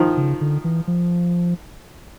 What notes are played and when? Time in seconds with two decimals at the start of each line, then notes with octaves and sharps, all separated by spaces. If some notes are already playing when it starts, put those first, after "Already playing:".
Already playing: D#3 F3
0.17 C#3
0.41 D3
0.64 E3
0.87 F3